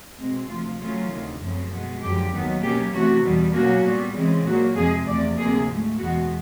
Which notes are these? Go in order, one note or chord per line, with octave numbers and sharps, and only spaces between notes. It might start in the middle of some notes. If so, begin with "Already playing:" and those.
B2 G#3 C4
D2 C3 F3 F4
C#3 F#3 A3 C#4 F4
D2 C3 D#3
F#2 C#3 F3 A3 C4
B2 G#3 B3
F#2 D3 F3 G4
D#2 D#3 F#3 B3
B2 F#3 A#3 C#4 G4
C3 E3 A3 F#4
E2 B2 G3 B3
B2 F#3 A#3 C#4 F#4
A#2 G3 B3
C#3 E3 G#3 C4
A#2 F#3 A#3 F#4
F2 C3 F3 G#3 G#4
E2 C3 F3 A3 D5
D2 C3 F3 A#3 G#4
G#2 F3 A3
E2 B2 G#3 B3 F#4